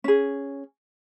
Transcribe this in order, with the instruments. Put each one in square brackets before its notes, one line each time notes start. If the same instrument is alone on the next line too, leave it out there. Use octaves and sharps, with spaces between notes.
[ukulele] C#4 G#4